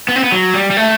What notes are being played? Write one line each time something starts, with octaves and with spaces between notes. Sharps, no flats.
B3
C4
B3
F#3
G3
G3
A3